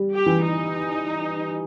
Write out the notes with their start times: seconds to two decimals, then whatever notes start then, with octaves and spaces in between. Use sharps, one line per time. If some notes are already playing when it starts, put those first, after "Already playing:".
Already playing: G3
0.11 G4
0.26 E3
0.41 D#4